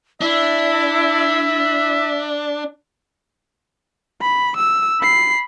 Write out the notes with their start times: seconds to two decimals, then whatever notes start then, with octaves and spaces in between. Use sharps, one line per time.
0.21 D4 E4 E5
4.21 B5
4.57 E6
5.01 B5 C7